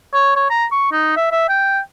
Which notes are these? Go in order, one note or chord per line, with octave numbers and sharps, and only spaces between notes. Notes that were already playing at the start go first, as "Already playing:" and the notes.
C#5
C#5
A#5
C#6
D#4
E5
E5
G5